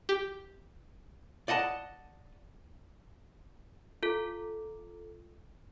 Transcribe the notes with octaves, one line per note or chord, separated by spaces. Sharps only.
G4
D5 D#5 F#5 A5
F4 A4